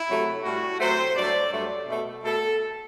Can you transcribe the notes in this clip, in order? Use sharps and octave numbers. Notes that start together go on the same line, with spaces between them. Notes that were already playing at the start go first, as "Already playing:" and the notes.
Already playing: E4
C3 F#3 A3
A2 G3 F#4
C3 F#3 A3 C5
G2 F#3 A3 D5
G2 F#3 A3
B2 A3
B2 A3 A4